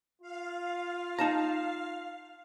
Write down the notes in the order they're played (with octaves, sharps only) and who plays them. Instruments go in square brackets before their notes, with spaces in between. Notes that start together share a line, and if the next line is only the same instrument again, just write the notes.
[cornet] F4 [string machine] F5
[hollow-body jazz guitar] D#4 A5 A#5